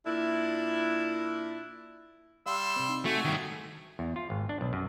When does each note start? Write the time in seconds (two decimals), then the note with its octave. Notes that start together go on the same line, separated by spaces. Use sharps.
0.06 A#2 D4 E4
2.46 G3 F5 C6 E6
2.76 C3 C4
2.89 D#4
3.05 A3 F#4 G#5
3.25 G2 D#3
3.99 E2
4.16 F4
4.30 G#1
4.49 D4
4.61 B1
4.73 F#2